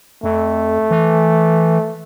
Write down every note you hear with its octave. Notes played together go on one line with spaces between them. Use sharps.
F2 A3
E3